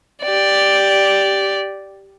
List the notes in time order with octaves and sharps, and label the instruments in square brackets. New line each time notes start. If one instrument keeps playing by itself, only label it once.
[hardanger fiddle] G4 D5